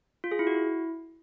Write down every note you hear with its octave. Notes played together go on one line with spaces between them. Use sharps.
F4
G#4
E4
F#4
E4